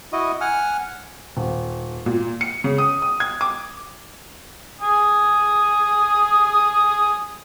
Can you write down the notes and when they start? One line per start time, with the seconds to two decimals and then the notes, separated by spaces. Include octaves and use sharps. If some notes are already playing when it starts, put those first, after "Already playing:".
0.12 E4 F#4 D#5
0.41 F#5 G#5 F6
1.37 D#1
2.06 A#2
2.41 C#7
2.64 C#3
2.78 D#6
3.02 D#6
3.20 G#6
3.41 D6
4.81 G#5 D#6